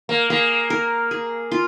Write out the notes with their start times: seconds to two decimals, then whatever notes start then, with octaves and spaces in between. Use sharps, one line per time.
0.09 A#3
0.30 A#3 G#4
0.70 A#4
1.11 G#4
1.52 F4